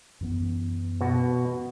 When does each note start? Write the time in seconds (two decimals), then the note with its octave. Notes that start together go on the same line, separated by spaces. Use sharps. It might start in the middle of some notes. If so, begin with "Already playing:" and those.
0.21 F#2 E3 B3
1.01 B2 F#4